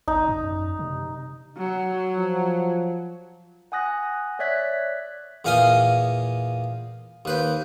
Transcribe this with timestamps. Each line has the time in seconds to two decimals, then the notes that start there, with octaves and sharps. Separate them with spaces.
0.08 G#1 D#4
0.29 F#2
0.79 C3
1.58 F#3
2.16 F3
3.72 F#5 G#5 D#6 F#6 A#6
4.39 C#5 D5 E5 F#6 G#6 B6
5.45 E2 A#2 F5 G#5 C6 D#6
7.25 D#2 B4 C5